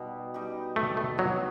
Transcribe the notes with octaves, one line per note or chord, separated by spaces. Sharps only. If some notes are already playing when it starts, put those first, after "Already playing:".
Already playing: B2 G3 D#4 G4
G3 D#4 G4
G3 A3
A3
F#3 B3 D#4 F#4